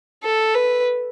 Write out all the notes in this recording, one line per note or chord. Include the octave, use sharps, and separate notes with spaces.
A4
B4